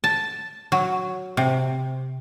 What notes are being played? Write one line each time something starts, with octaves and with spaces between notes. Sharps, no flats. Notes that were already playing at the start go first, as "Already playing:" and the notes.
A5
F#3
C3